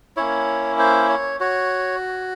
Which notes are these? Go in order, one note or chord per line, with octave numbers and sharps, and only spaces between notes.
A#3 C#4 E4 C#5
C5
C#5
F#4 C#5